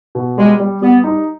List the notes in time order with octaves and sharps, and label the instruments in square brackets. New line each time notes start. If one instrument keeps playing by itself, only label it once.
[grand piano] B2
[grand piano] G3 [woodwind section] G#3
[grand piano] G3
[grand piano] G3 [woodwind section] B3
[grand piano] D#4